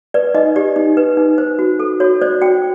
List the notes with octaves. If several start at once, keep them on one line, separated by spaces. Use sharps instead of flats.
B4 D5
D#4 D#5
G4 D5
D#4
B4
D#4
C5
F#4
A4
F#4 C#5
C5 D5
F#4 G5